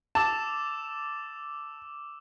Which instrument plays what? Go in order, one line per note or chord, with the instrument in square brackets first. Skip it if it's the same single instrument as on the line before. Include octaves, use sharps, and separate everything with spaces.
[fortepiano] A5 [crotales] D6 E6 E7